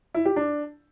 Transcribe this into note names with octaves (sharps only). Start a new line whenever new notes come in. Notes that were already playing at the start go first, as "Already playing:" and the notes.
E4
G4
D4